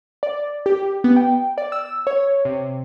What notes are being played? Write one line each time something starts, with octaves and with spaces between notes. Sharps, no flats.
D5
G4
B3
G5
D5
E6
C#5
C3